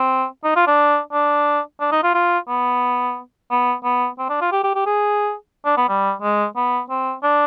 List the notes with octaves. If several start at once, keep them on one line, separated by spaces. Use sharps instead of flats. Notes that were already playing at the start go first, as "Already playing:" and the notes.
Already playing: C4
D#4
F4
D4
D4
D4
D#4
F4
F4
B3
B3
B3
C4
D4
F4
G4
G4
G4
G#4
D4
B3
G3
G#3
B3
C4
D4